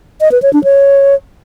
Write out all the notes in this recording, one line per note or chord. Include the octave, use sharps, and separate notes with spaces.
D#5
B4
C#5
D4
C#5